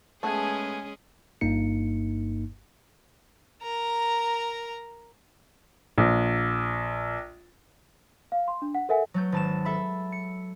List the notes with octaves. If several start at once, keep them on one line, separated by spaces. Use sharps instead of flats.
G#3 A3 B3 C#4 G#4 G#5
G1 G2 A#3 D#4 C#7
A#4 A#5
A#1
F5
C6
D4
F#5
A4 A#4 E5 F#5 G#5
F#3 A3 G6
G#1 A5 E7
A4 E5 B5
C#7